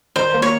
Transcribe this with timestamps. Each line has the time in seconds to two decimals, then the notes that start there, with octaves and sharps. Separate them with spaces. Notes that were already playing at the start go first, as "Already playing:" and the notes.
0.16 D#3 C5
0.34 A#3
0.42 C#5